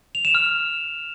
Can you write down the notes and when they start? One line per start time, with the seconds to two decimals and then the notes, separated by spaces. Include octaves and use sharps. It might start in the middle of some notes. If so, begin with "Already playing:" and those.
0.15 F7
0.25 E7
0.35 F6